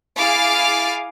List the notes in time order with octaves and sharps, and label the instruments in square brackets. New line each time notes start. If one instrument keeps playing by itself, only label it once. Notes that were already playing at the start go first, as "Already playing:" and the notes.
[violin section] E4 G#4 F5 D6 F6 A6